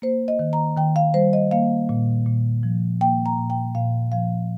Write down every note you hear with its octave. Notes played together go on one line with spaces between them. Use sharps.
A#3 C5
D#5
D#3
A#5
D#3 G5
F5
G3 C5
D#5
A#3 F5
A#2
A#2
F3
A#3 G5
A#5
A#2
G5
A#2 F5
F3 F5